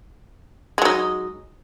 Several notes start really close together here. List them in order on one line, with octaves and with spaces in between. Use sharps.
G#3 F#3 D#4